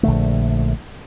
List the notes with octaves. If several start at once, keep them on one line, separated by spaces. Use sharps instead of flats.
A#1 D3 A3